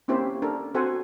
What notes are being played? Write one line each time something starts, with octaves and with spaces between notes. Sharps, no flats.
A#3 C4 C#4 E4 G4 C5
D4 A4 A#4
C4 F#4 A4 C5 F#5 G#5